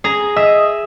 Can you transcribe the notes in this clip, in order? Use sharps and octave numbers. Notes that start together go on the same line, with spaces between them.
G#4 A#5
D#5 E5 D#6